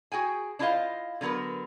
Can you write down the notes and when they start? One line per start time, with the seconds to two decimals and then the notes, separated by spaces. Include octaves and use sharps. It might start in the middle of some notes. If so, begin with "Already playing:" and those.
0.12 F#4 G#4 G5 G#5
0.59 D4 E4 F4 C5 D#5 F5
1.21 D3 F#3 B3 A#4 B4